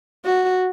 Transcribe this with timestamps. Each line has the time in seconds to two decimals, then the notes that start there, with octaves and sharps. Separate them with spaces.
0.25 F#4